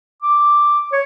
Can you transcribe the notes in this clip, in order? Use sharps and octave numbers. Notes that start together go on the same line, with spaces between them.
D6
C#5